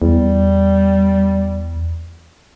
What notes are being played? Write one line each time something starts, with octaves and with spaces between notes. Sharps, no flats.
E2 G3